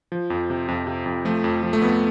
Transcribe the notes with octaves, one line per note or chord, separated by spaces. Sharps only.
F3
F2
C3
F2
C3
F2
F3 A3
F2
F3
A3
F2 B3